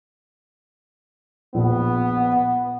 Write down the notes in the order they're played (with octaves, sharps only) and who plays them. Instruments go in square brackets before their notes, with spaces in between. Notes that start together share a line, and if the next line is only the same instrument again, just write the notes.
[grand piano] A#1 [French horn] B3